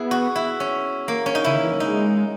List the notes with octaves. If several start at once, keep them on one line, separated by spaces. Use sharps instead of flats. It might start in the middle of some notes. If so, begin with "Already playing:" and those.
Already playing: B3 E4 G#4
F#4
E4
C#4
A#3
C#4
D#4
C#3 E4
D#3
E3
F#3
G#3 D#4